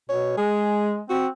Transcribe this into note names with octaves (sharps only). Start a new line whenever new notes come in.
B2 C#5
G#3 G#4
C4 F#4